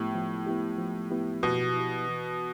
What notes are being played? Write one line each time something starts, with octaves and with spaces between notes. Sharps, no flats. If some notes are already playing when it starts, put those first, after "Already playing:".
Already playing: A2 F3 B3 E4 G4
F3
B3 E4 G4
F3
B3 E4 G4
B2 F3
B3 E4 G4
E3